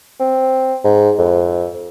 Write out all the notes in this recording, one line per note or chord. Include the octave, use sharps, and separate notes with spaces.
C4
G#2
F2